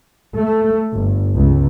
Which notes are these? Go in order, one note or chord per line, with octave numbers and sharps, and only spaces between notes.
A3
G1
C#2